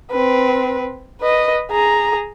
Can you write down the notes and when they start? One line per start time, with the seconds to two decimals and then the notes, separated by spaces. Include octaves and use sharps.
0.11 C4 B4
1.21 B4 D#5
1.71 G#4 A#5